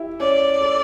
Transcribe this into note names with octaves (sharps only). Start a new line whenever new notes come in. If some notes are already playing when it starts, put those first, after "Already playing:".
Already playing: E4 G4 E5
C#4 C#5 D5
A4